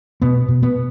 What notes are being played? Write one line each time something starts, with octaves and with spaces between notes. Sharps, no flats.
B2 B3
B2
B3